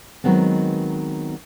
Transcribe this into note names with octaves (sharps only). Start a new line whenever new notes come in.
D#3 F#3 G#3 B3 C4